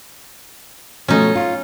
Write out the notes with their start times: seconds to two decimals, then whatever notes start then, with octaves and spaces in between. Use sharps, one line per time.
1.08 B2 F3 A3 C#4 D#4
1.35 F4